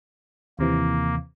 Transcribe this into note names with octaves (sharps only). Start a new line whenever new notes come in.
D#2 C3 E3 A#3